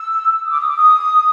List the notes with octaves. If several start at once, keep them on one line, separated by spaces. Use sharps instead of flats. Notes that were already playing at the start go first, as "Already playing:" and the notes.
Already playing: E6
D#6
D6
E6
D#6
D6
D#6